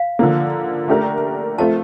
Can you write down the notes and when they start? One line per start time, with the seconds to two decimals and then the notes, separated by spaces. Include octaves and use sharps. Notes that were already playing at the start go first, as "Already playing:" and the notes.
Already playing: F5
0.19 D3 F3 A#3
0.88 A3 D4 G4 A#4
1.58 F3 A3 C4 F4 A5